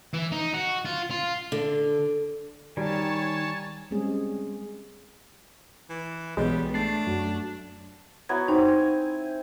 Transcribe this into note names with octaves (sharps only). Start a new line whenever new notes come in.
E3
D#4
F#4
F4
F4
D3
D#3 G3 C#5 G#5 A5
G3 G#3 C4 C#4 G#4
E3
B1 E3 G3 G#3 B3 C#5
A3 D4 A6 C7
F#2 F#3 F#4
F#3 B3 E4 G#6
C4 D#4
G#5